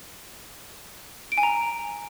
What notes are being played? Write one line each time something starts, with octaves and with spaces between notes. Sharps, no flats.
D7
G#5
A#5